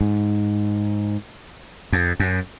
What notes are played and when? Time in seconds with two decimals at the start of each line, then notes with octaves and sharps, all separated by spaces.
0.01 G#2
1.92 F2
2.20 F#2